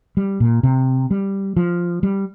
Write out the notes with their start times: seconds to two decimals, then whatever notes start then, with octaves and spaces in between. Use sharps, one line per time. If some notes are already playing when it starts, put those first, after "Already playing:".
0.17 G3
0.40 A#2
0.63 C3
1.11 G3
1.57 F3
2.03 G3